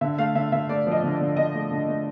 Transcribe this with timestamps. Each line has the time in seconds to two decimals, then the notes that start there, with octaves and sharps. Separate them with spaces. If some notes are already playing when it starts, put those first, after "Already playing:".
0.01 D3 E5
0.18 A3 F5
0.35 D3 E5
0.52 D3 E5
0.69 A3 D5
0.87 F3 D#5
1.03 D3
1.14 D5
1.21 D3
1.37 D3 D#5
1.54 A3
1.71 D3
1.88 A3